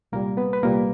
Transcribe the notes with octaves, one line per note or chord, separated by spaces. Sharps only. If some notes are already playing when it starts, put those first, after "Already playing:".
C2 A#2 G3 A#3 A#4
B3 B4
B4
C2 A#2 G3 A#3 A#4